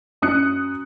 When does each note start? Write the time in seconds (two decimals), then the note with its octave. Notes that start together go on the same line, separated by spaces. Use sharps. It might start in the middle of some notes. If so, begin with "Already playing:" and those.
0.22 F#2 D#6 F#6 C#7